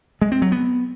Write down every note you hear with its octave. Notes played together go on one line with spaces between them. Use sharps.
G#3
C4
F#3
B3